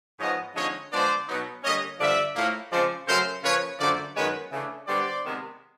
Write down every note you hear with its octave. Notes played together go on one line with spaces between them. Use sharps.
G#2 F3 G#3 B3 C#5 D#5
D3 F3 G#3 C4 D#4 C#5 D#5
D3 F3 G#3 B3 D4 C5 D5
B2 F#3 B3 D#4
D3 G3 A#3 C#4 C#5 D#5
G2 D3 F3 D5 E5
A2 F3 A#3
C#3 F3 G#3 C4 C5 D5
C#3 F#3 A3 C#4 A#4 C5
C#3 F3 A#3 B4 C#5
F#2 D3 F3 A3 C5 D5
F#2 D#3 G#3 B3 B4 C#5
C#3 E3 A3 D4
D3 G3 B3 C5 D5
C3 D#3 G#3 B3